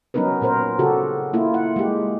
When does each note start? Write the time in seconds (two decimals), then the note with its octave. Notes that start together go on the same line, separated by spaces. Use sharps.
0.14 F#3 B3 C#4 D#4 A#4 B4
0.41 A#2 C#4 A#4 C5
0.79 C#3 F#4 G4 A4
1.33 A#3 E4 F4
1.54 F#5
1.76 G#3 G4